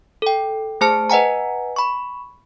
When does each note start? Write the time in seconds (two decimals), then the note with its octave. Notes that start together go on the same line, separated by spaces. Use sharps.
0.22 A4 G5
0.81 A3 G#4 C5 A5 F6 C#7
1.10 B4 D#5 F#5 G#5 A#5
1.76 B5 C#6